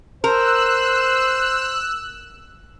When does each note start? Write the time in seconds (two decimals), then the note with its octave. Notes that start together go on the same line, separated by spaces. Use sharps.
0.24 A#4 C5 E6 F#6